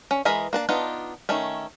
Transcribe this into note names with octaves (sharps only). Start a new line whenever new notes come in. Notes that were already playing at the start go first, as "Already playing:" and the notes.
C#4
E3 G#3 G#4 A#4 B5
A#3 D4 A5
B3 D4 D#4 F4
D#3 A3 C#4